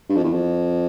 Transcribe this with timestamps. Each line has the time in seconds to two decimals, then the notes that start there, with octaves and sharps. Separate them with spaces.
0.09 G2
0.17 F2
0.24 E2
0.33 F2